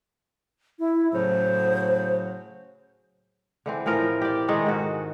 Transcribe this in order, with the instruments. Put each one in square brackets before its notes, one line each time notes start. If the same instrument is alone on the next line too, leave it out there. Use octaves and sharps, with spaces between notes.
[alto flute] E4
[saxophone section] A2 C#3 F#3 [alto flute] C5
[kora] D3 E3 C4
A2 E3 F3 A#4
G4 D5
D#3 G#3 A4 D#5
G#2 F#4